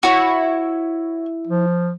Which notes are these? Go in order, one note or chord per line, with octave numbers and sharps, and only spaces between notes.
E4 F#4 C#5
F3